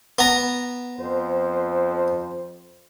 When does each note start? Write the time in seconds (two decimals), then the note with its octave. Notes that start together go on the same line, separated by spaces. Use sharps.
0.19 B3 A#5
0.98 F2 C5